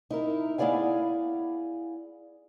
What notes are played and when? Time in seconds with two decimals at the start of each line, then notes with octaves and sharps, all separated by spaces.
0.10 D#4 E4 A#4
0.58 B3 E4 G#4 D5 F5 G#5